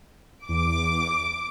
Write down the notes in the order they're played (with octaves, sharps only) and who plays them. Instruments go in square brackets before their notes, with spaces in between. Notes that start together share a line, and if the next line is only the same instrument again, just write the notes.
[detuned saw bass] E2 [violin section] D6